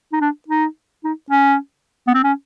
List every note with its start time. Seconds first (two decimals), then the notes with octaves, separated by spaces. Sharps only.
0.13 D#4
0.21 D4
0.49 D#4
1.04 D#4
1.31 C#4
2.08 B3
2.14 C4
2.24 C#4